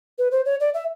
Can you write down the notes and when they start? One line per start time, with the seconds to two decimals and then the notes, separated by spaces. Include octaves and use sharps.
0.18 B4
0.31 C5
0.45 C#5
0.60 D5
0.74 E5